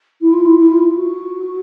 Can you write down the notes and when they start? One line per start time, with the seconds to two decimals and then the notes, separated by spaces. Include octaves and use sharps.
0.21 E4
0.33 F4
0.46 E4
0.59 E4
0.71 F4
0.96 F#4